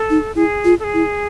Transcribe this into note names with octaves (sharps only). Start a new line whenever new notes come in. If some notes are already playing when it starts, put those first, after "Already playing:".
Already playing: A4
D#4
E4 G#4
F4
A4
G#4
E4